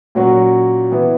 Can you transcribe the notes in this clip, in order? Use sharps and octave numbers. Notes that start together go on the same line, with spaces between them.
A#2 F#3 C#4 F#4
E3 B3 E4